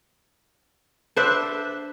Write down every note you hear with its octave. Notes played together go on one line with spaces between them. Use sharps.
D4 B4 C5 E5